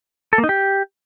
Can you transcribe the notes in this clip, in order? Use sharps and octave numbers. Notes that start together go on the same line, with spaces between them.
A4
A#3
D#4
G4